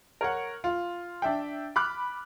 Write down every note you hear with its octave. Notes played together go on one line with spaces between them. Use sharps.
A#4 C#5 F#5
F4
D4 E5 G5
B5 D6 F6 F#6